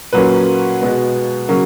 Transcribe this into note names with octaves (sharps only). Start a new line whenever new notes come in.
A#2 F#3 A#3 C#4 B4
B2 G#3 B3
C#3 F#3 A#3 C#4